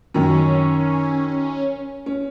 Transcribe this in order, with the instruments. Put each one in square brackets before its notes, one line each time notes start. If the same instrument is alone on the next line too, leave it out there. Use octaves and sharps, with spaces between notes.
[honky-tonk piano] F#2 D#3 [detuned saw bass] C#4
[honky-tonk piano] C#4